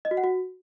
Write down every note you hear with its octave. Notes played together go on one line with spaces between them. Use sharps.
D#5
F#4
F#5
F#4